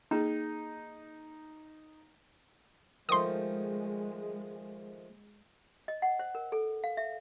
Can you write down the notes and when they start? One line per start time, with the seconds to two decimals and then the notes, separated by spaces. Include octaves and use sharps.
0.11 A#3 D#4 G#4
3.09 D#3 F3 G#3 A3 C6 D#6
5.88 D#5
6.02 F#5
6.19 C5
6.35 A#4
6.52 A4
6.84 F5
6.97 E5